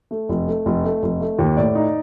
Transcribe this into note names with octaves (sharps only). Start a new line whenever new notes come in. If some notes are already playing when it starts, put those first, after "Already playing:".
A3
F1
A3
F1
A3
F1
A3
D#2
A2 D5
D#4